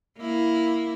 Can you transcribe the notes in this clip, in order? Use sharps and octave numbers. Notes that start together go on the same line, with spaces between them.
A#3 E4